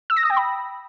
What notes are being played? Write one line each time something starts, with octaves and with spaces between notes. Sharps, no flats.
E6
A#6
D#6
G5
B5